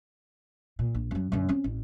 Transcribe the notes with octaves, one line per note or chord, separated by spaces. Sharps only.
A#2
A#1
F#2 F#3
F#2 D3
C4 C#4
A1